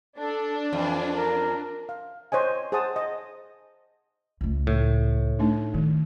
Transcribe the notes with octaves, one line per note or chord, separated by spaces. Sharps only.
D4 A4
F2 E3
A#4
F5
C5 C#5 D#5 G#5
G#4 C5 F#5 A5 D#6
D#5
C#2 A3
A2
A3 D4 D#4
D#3 A3